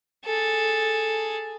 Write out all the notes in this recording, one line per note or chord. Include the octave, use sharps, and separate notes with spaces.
G#4 A4